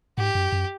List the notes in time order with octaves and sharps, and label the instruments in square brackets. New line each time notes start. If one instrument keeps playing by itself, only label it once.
[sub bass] G#2 [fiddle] G4
[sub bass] F#2
F#2